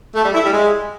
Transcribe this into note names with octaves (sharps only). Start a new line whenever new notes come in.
A3
G3
E4
G3
G#3